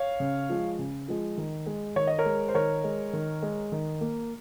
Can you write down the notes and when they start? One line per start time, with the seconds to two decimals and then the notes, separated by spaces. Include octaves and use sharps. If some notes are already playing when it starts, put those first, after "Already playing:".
Already playing: C#5 F5
0.20 C#3
0.50 F3 G#3
0.79 C#3
1.08 F3 G#3
1.37 D#3
1.66 G#3
1.96 D#3 C#5
2.07 D#5
2.18 A#4 C#5
2.25 G#3
2.48 C5
2.54 D#3 A#4 C#5
2.84 G#3
3.13 D#3
3.42 G#3
3.72 D#3
4.01 A#3